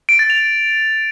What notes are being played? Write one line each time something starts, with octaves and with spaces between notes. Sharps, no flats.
D7
A6
F7